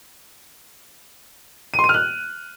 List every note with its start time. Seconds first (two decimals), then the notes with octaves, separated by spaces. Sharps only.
1.74 D#7
1.79 C6
1.84 D#7
1.89 F6
1.94 F#6